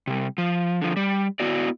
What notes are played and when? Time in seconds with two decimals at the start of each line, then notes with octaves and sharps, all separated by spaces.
0.07 C3 G3
0.38 F3
0.82 D3 F3
0.97 G3
1.40 B3 E4 F#4 D5